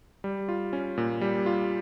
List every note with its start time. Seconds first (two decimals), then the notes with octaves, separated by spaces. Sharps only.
0.24 G3
0.49 F4
0.73 C#4
0.98 A#2
1.21 G3
1.46 F4